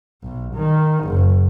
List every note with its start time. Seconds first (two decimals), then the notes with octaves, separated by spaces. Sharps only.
0.23 B1
0.55 D#3
1.05 F#1